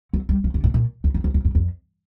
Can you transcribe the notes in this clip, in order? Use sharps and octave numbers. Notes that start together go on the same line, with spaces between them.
F#3
G3
F3
D3
A2
A#2
E2
F2
E2
F2
F#2
F2